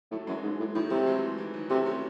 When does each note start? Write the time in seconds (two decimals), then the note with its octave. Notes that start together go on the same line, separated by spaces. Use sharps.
0.11 A2 F#3 A3
0.27 F#2 E3 G#3
0.43 G#2
0.59 A2
0.75 A2 D#3 F#3
0.90 C3 F#3 A3
1.06 E3 G#3
1.38 E3
1.54 D#3 F#3
1.69 C3 F#3 A3
1.86 A3 C#4